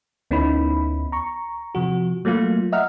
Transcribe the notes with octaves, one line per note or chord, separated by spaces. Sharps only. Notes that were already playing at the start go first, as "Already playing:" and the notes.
D2 B3 C#4 D#4 E4 B5
A#5 C#6
C3 F3 F#4
F#3 A3 A#3 F4
D#5 E5 F#5 A#5 F6